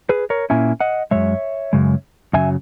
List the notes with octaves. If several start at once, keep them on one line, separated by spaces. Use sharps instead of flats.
G#4 B4
A#4 C#5
A#2 A#3 C#4 E4 E5 G#5
D#5 F#5
F#2 C#3 G#3 C#5 E5
F#2 C#3 G#3
F#2 C#3 F#3 E5 G#5